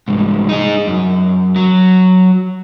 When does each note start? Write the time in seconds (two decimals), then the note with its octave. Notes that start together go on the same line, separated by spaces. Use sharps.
0.08 C2 G#2
0.49 D#4 G#4
0.87 F#2
1.56 F#3